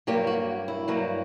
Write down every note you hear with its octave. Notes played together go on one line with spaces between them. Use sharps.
G2 F#3 A#3 G4
F#4
E4
G2 F#3 A#3